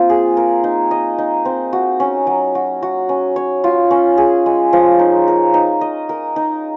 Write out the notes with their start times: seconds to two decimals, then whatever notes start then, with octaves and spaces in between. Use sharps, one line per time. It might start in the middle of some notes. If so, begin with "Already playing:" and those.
Already playing: A#3 C4 F4
0.09 G#4
0.37 A#4
0.64 D#4
0.91 D#5
1.18 D#4
1.45 C4
1.73 F#4
2.00 C#4
2.27 F#3
2.55 F#4
2.83 F#4
3.09 C#4
3.36 C#5
3.64 F4
3.91 C#4
4.18 G#4
4.46 G#3
4.73 F3
4.99 D#4
5.28 A#4
5.54 D#4
5.81 D#5
6.09 A#4
6.36 D#4